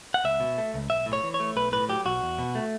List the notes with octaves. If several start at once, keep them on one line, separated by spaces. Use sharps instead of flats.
F#5
C#2 E5
B2
A3
C#2
B1 E5
A2
C#5
E3
C#5
A3
B1 B4
A2 B4
F#3 G4
B1 F#4
E2
B2
A3